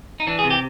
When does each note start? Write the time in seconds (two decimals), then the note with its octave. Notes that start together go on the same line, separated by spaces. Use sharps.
0.20 D#4
0.27 E3 D4
0.39 G#4
0.44 C3
0.50 G4